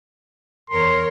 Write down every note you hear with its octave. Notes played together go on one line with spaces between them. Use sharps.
E2 A#4 C#5 C6